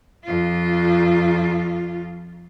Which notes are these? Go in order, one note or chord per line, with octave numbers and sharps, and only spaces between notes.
F2 F4